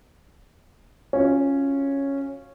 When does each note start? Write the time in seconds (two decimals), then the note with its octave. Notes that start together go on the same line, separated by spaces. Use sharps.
1.13 C#4 F4 F#4